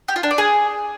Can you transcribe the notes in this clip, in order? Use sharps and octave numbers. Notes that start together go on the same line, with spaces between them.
G4
F4
D4
D5
G#4